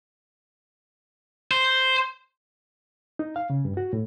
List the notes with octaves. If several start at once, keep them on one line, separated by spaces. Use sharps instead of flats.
C5
D#4
F5
C#3
G2
F#4
A2